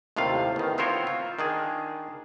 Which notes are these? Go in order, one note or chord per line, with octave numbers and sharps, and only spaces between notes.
D#2 A2 C3 F4 F5
E2 D#3
B3 C4 F4 A#4 C5 C#5
F4
D#3 D4 G#4